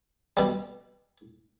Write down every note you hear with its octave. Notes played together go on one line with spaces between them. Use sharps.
B2 G3